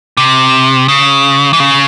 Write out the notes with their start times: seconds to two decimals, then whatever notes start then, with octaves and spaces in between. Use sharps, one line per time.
0.17 C3
0.88 C#3
1.53 E3
1.60 C#3